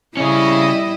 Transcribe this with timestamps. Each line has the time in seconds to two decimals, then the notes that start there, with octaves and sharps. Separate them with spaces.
0.17 C#3 G3 C#4 E4 D#5